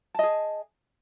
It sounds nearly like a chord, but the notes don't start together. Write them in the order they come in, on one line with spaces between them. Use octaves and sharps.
A5 D#5 G#4